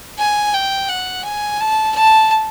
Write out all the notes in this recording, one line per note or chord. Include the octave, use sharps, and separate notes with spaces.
G#5
G5
F#5
G#5
A5
A5